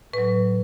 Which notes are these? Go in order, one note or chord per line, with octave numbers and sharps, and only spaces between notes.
A2 F#3 B4